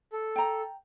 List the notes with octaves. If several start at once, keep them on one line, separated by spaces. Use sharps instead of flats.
A4
G5 A#5